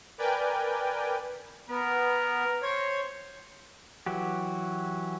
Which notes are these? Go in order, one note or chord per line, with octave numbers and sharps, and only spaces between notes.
A#4 B4 D5 G5 G#5
B3 A#4
C5 C#5
E3 F#3 F#4 G4